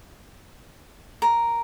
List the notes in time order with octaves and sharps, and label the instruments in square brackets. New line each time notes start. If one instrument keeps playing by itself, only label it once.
[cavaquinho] A#4